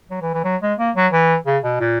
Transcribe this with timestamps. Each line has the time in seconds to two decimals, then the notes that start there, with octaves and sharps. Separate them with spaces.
0.10 F#3
0.22 E3
0.34 E3
0.45 F#3
0.62 G#3
0.79 A#3
0.96 F#3
1.12 E3
1.46 C#3
1.64 B2
1.80 A#2